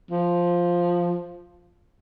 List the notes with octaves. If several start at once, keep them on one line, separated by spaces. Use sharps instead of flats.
F3